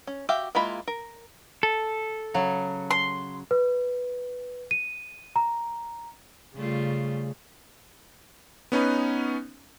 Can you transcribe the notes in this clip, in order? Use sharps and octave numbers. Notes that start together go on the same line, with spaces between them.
C#4
F#4 G4 E5 F5 G5
G#3 A#3 E4 F4 B5
A#4
A4
C#3 F#3
C6
B4
D#7
A#5
C#3 G3 A3 F4
B3 C#4 D#4 B4